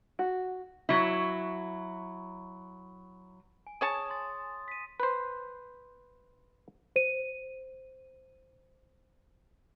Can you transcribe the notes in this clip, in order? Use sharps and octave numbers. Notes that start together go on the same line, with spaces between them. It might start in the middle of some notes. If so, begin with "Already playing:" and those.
F#4
F#3 E4
G#5
G#4 C#5 A5 D#6
C6 A6
B6 D#7
B4 C5
C5 D#7